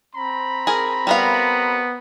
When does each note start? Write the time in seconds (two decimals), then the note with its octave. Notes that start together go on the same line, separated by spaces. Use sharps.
0.15 C4 A#5 B5
0.67 G#4 A#4
1.07 G3 B3 A#4 F5